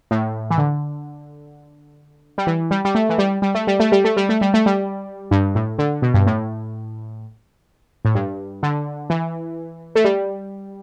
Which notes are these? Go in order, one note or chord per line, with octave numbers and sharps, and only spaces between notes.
A2
E3
D3
G3
E3
G3
G3
A3
E3
G3
G3
A3
G3
A3
G3
A3
G3
A3
G3
A3
G3
G2
A2
D3
B2
G2
A2
A2
G2
D3
E3
A3
G3